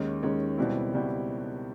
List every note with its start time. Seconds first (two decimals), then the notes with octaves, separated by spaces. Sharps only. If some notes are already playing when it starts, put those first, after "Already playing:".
Already playing: D#2 D#3 G#3 C#4
0.23 D#2 D#3 G#3 C#4
0.58 C#2 B2 G3 C4 E4
0.93 C#2 B2 G3 C4 E4